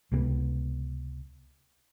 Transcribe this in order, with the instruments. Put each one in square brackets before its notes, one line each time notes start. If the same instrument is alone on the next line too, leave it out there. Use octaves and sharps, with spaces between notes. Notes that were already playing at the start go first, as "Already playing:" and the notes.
[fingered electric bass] C#2 C3 G#3 B3